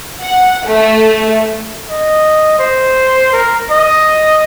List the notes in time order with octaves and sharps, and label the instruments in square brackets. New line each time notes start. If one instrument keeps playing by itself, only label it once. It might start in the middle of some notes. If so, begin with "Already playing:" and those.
[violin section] F#5
A3
[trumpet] D#5
C5
A#4
D#5